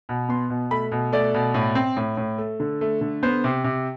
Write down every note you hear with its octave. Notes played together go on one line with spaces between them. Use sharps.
B2
B3 C6
B2
A3 B5
B2
A3 D5
B2
A2
C4
A2
A2
A3
D3
A3
D3
B3 C5
C3
C3